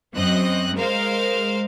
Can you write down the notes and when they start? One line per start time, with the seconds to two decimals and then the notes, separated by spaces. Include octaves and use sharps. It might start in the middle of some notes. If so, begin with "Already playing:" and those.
0.15 F#2 C4 D#5 F#6
0.76 G#3 A#4 C5 F5